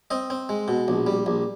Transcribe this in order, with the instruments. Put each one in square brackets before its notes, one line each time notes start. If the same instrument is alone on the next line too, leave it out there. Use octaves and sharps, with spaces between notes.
[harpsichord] C4 D#5
C4
G#3
B2
A#1
G3
A#1